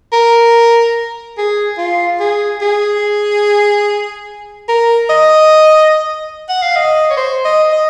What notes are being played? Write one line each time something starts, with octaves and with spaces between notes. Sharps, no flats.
A#4
G#4
F4
G#4
G#4
A#4
D#5
F#5
F5
D#5
C#5
C5
D#5
D#5